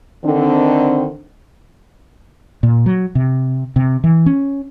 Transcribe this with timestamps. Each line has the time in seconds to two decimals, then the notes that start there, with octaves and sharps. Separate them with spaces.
0.25 D3 D#3 C4
2.63 A#2
2.86 F#3
3.15 C3
3.76 C3
4.04 E3
4.26 C#4